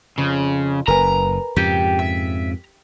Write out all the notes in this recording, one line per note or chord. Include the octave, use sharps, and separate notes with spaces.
F2 C#3
F#1 A#4 B4 G#5 A#5
F2 G#2 C#3 G4
E5